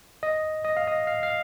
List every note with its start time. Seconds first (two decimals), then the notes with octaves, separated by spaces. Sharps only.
0.23 D#5
0.65 D#5
0.77 F5
0.88 D#5
1.07 F5
1.23 F5